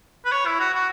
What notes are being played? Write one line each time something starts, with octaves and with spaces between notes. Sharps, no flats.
B4
C#5
E4
F#4
F#4